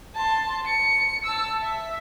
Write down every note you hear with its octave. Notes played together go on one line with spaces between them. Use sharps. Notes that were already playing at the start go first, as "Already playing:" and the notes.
A5 C6
C#7
A5 E6
E5